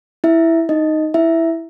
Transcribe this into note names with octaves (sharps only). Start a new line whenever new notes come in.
E4 E5
D#4 D#5
E4 E5